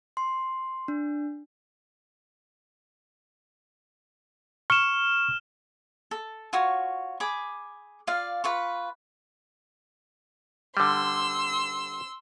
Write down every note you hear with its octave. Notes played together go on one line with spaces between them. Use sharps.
C6
D4
C#6 F6 E7
A4
F4 F#4 C#5
G#4 B5 D6
F4 D5 F5
F4 B4 C#6
D3 G3 C6 E6